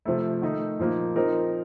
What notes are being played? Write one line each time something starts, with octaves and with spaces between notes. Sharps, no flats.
C3 F3 A3
D#3 A3 D#4
A#2 F3 A#3 D#4
F3 C4 D#4 A#4